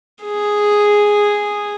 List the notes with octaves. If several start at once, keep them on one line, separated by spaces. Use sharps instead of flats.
G#4